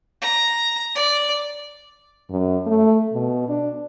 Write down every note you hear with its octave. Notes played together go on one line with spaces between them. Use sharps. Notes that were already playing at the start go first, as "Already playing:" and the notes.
A#5
D5
F#2
A3
B2
D4